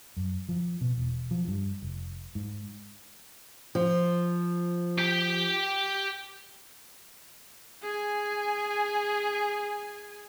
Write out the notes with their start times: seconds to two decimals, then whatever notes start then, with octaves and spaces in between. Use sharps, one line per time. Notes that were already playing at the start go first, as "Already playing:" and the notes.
0.17 F#2
0.49 F3
0.81 B2
0.97 E1
1.31 F3
1.48 G2
1.82 F1
2.35 G#2
3.75 F3
4.98 G4 G5
7.82 G#4 G#5